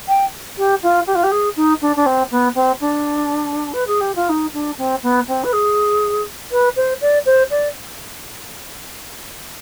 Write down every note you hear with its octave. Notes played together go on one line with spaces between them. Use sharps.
G5
G4
F4
G4
F4
G4
G#4
D#4
D4
D4
C4
B3
C4
D4
B4
G#4
G4
F4
D#4
D4
C4
B3
C4
B4
G#4
B4
C5
D5
C5
D5